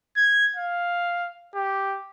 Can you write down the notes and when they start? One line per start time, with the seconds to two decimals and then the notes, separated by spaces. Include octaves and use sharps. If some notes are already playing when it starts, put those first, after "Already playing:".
0.16 G#6
0.56 F5
1.55 G4